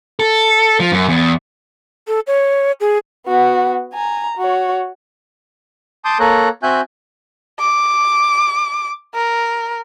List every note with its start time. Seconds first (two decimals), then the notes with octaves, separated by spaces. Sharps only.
0.20 A4
0.80 F3
0.92 F#2
1.09 E2
2.08 A4
2.27 C#5
2.80 G#4
3.27 B3 F#4
3.93 G#5 A#5
4.38 F#4 C#5
6.05 A5 C6 D6 D#6 G6
6.20 A#3 A4 C#5 A#5 F#6
6.63 C4 F#4 E5 G#5 F#6 G6
7.59 D6
9.14 A#4